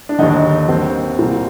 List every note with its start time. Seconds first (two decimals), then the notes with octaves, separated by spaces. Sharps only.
0.09 D4
0.19 D#2 D3 D#4
0.68 D#2 D#3 C4
1.19 C2 A#2